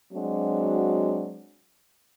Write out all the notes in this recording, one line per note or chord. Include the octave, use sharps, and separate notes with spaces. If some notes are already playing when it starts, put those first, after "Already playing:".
F#3 G#3 C4 D4 F#4